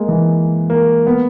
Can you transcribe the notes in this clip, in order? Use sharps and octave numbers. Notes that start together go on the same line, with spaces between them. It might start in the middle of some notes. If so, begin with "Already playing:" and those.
Already playing: G#3 A#3
E3
A#3
B3